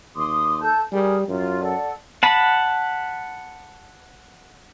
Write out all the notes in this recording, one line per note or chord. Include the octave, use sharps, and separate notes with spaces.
D#2 C6 D6 D#6
A4 A5 G6
G3 G#4 A#4 G#5
F#2 F4
A4 D5 F#5
F#5 A5 B5